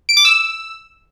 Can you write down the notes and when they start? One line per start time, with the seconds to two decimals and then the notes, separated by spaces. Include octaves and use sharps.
0.09 D7
0.17 D6
0.25 E6